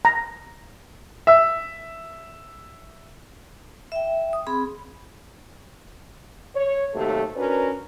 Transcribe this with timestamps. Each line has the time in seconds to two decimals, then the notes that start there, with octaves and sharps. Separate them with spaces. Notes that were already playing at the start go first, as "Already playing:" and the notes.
0.05 A#5
1.27 E5 E6
3.92 E5 G5
4.33 D#6
4.47 C4 G#4 B5
6.55 C#5
6.95 D#2 C3 F#3 A3 A4
7.36 C#4 D4 F#4 A#4 B4